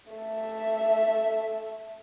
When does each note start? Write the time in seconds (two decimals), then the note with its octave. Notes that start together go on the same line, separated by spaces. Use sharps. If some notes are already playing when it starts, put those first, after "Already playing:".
0.13 A3 E5